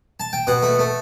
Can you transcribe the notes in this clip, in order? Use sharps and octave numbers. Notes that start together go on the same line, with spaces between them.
A5
G5
B2 F#5
A3
A3